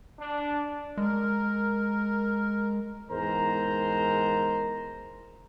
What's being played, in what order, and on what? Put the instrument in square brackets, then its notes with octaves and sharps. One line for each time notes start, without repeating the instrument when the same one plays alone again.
[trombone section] D4
[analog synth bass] G#3 [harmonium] A#4
[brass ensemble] E2 G#2 A#4 C5 A#5